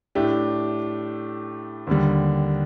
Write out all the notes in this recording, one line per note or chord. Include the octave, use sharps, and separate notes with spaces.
A2 A3 D4 G4
D#2 D3 G3